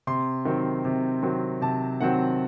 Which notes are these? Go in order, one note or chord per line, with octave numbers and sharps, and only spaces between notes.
C3 C6
D#3 F#3 C4
C3
D#3 F#3 C4
C3 A5
D#3 F#3 C4 F#5